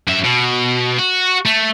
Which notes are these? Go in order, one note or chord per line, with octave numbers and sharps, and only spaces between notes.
F#2 E5
B2
F#4
A3